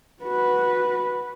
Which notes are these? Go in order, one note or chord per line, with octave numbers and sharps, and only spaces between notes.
F#4 B4